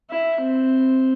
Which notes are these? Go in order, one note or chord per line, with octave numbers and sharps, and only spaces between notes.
E4
C4